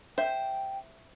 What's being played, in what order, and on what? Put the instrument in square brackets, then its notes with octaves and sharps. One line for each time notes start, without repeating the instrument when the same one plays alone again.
[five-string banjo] C5 E5 [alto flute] G5